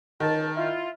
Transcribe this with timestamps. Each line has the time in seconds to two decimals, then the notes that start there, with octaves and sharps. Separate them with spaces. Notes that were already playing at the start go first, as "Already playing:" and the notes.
0.20 C#2 D#3 A5
0.56 E4 F4